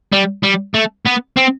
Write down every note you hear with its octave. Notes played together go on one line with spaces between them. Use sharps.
G3
G3
A3
B3
C4